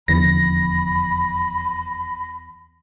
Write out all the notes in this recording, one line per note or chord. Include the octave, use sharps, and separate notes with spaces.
F1 E2 D3 F3 B5 A#6